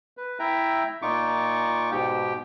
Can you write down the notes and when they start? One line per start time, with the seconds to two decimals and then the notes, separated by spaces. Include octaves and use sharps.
0.17 B4
0.39 E4 E5 G5 A#5
1.02 A#2 D#4 F4 C#6 D6
1.92 G#2 B2 G4 G5